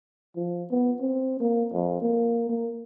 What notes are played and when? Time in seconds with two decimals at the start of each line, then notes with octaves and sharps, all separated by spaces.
0.36 F3
0.71 B3
1.01 C4
1.40 A#3
1.73 F2
2.02 A#3
2.49 A#3